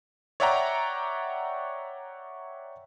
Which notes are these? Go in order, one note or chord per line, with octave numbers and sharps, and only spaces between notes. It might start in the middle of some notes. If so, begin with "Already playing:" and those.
C#5 D5 E5 F#5 G5 A#5